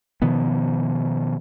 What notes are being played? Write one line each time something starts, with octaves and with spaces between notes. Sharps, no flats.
B2 D#3 F3 B3